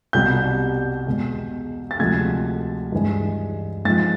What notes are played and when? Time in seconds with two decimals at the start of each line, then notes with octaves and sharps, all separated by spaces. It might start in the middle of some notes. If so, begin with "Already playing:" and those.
0.13 C2 B2 G3 G6
1.07 E2 B2 G#3
1.91 A6
1.99 D2 C3 F3 G#3 G#6
2.92 G2 E3 G#3
3.85 G#2 F3 G#3 A6